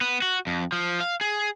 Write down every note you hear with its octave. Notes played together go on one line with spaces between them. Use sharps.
B3
F#4
F2
F3
F5
G#4